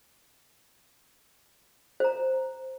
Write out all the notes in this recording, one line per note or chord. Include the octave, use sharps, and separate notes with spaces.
C5 A#5